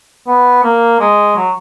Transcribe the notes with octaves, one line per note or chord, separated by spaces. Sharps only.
B3
A#3
G#3
F#3